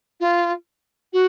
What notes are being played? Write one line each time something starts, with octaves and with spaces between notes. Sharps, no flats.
F4
F#4